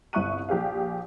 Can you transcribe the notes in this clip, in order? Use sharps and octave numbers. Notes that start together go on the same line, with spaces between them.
G1 C2 E5 C#6 F#6 D#7
A#1 G4 G#4 F5